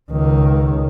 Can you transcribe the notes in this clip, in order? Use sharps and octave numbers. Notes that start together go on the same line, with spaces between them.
C#2 D#3